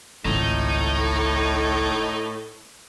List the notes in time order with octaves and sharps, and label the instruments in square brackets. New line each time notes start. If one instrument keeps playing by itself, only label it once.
[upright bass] G#1 C#2 [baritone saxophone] A2 [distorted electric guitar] D#4